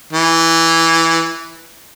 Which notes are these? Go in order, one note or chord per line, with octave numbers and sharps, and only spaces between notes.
E3